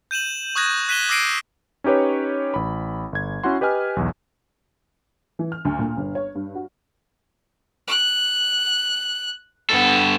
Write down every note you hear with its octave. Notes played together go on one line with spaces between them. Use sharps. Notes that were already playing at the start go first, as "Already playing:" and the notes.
G6 D#7 E7 F#7
C#6 D#6 F#6 G#6 A#6
F#6 B6 D#7 E7 G7
D6 E6 A#6 C7 D7 D#7
C#4 D#4 G4 B4 C#5
A1 B5
G1 G#6
C#4 E4 F#4 F#5 C6
G4 B4 D#5 G#5 F6
B1 E2
E3
F6
D2
A#2
G1
C#5
G2
F#4
F#6
G2 B3 A4